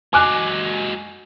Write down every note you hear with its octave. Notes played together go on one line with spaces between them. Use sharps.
F#3 G#3 G#5 D6 F#6